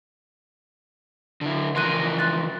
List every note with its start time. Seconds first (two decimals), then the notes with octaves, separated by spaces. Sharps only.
1.41 D3 E4
1.76 E3 F3 A#4 C6 F#6 D#7
2.19 C6 F#6 A6